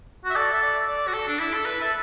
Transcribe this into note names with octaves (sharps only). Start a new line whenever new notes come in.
F#4
E5
A4 D5
E5
D5
D5
F#4
A4
D4
E4
A4
B4
A4 E5